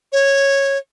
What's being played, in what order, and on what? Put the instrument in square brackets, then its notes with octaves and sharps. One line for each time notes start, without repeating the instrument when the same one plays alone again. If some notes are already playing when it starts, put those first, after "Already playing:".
[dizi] C#5